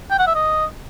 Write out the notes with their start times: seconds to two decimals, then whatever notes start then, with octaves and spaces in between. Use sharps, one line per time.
0.11 G5
0.19 F#5
0.27 E5
0.35 D#5